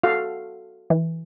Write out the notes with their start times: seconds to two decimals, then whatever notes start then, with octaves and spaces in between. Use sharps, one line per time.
0.03 F#4 A4 F5
0.90 E3